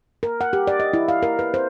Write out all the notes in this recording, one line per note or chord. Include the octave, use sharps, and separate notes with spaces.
A#4
F#5
G4
D5
D#5
E4
F5
A#4
B4
C5